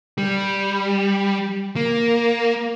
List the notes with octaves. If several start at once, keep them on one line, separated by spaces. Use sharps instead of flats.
G3
A#3